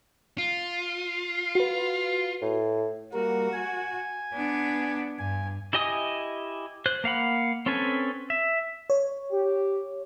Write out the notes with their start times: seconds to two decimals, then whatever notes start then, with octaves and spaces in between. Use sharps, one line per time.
0.38 F4
1.55 F#4 B4
2.42 A2
3.14 G3 A#3 F#4 A#4
3.53 G#5
4.34 B3 D4
5.19 G2 G#5
5.73 E4 G4 D#5 G#5 D#6
6.86 C5 F#6
7.04 A#3 F5 F#5 B5
7.66 C4 C#4 A4 B4 G#5
8.30 E5
8.90 C#5
9.31 G4